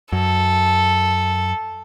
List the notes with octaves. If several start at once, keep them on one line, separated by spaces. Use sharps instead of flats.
F#2 A4